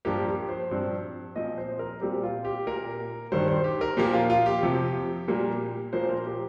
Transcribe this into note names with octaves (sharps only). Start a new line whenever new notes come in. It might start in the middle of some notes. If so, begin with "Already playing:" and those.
G2 F3 A#3 G4
G4
C5
G2 F3 C4
A#2 F3 C4 D#5
C5
A#4
A#2 G3 C4 G4
F4
G4
A#2 A#3 A#4
G2 D#3 G3 C5
C5
G4
A#4
A#2 F3 A#3 G4
F4
F4
G4
F2 C3 F3
A#2 G3 A#3
A#2 F3 A#3 C5
A#4
G4